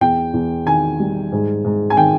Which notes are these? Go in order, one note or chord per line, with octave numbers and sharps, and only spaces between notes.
E2 G5
E2
D#3 G#5
G3
G#2
G#2
G#5
D#3 G5